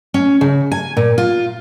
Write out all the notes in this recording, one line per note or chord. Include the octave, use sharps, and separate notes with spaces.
C#4
C#3
G#5
A#2
F4